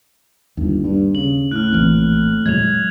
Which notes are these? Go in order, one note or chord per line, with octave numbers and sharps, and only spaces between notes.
G1 D#2
G2
C#3 F#7
A2 F6 F#6
A#1 E3 C4
A#2 F#3 G#3 G#6 F7